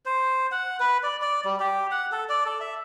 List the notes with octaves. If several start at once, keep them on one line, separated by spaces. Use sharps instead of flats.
C5
F#5
B4
D5
D5
G3
G4
F#5
A4
D5
A4
E5